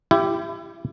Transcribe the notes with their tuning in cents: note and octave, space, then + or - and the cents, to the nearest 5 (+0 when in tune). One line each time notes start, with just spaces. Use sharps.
E4 +30 G4 +0